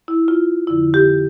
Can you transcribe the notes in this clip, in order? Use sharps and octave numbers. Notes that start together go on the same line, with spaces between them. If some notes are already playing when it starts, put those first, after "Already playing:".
E4
F4
F2 D3 F3 E4
G4